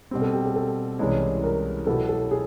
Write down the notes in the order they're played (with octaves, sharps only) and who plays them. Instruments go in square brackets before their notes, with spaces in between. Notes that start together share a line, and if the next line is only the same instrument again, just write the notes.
[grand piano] B2 G3 C4
[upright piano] A4
G4
G#4
A4
[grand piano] C2 C3 E3 G#3 C#4
[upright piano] A#4
[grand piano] B2 F#3 B3 E4 G4 [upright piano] A4
[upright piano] A4
G#4